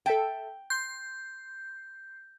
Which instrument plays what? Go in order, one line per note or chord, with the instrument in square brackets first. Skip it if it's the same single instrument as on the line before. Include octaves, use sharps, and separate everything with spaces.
[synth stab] A4 E5 A5 [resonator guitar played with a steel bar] G5
[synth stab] C6 C7 [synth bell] G6